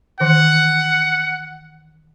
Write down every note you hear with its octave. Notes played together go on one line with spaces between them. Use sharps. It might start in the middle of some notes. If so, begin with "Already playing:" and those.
D#3 E3 C5 F#5